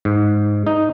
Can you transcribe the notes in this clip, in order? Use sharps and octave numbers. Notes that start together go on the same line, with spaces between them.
G#2
D#4